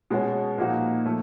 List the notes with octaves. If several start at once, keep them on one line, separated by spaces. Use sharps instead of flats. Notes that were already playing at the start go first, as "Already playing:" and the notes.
B2 G#3 C#4 F#4
A#2 F3 A#3 D#4 F#4
F3 A3